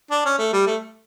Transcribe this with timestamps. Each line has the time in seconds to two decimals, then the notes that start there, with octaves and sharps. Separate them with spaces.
0.11 D4
0.25 C#4
0.39 A3
0.53 G3
0.67 A3